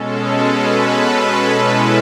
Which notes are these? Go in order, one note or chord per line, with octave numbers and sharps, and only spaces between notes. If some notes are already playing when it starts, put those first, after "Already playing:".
Already playing: B2 G#3 C#4 A4
B4
E4